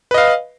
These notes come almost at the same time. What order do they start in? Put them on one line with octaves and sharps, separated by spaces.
B4 D#5 F5